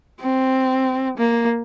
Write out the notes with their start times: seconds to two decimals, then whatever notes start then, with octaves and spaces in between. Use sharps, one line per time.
0.20 C4
1.18 A#3